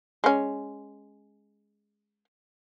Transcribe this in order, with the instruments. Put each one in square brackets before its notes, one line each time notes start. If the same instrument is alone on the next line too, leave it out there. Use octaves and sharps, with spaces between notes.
[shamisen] G#3 C#4